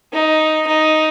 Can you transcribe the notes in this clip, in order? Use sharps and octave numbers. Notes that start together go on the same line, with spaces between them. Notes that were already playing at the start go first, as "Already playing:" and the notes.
D#4
D#4